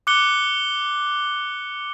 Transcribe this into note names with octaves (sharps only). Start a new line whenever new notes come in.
D6 F#6 C#7 G7